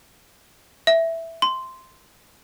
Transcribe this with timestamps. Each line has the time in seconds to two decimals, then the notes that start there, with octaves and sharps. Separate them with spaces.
0.87 E5
1.42 C6